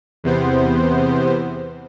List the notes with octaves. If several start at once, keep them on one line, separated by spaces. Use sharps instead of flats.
E2 C3 B3 C5